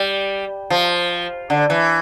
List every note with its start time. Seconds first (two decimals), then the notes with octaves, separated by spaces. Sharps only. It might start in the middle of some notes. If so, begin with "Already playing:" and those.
Already playing: G3
0.70 F3
1.50 D3
1.70 E3